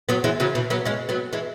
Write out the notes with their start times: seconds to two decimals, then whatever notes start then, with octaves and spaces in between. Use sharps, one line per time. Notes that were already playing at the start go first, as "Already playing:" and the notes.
0.09 F#3 B3
0.24 E3 G#3
0.40 C#3 F#3
0.55 B2 E3
0.70 F#3 B3
0.85 G#3 C#4
1.09 F#3 B3
1.33 E3 G#3